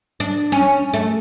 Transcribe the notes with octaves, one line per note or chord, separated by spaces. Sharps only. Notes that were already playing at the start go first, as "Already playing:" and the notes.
D4
C#4
A3